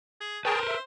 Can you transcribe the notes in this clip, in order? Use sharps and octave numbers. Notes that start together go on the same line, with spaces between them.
G#4
G#4 A#4 B4 C#5 G5 A5
C5
E5